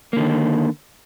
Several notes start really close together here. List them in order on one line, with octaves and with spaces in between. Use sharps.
A#3 D3 D#3